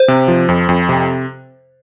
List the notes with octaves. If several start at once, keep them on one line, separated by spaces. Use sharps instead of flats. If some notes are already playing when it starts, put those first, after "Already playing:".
Already playing: C5
C3
F3
F2
F2
C3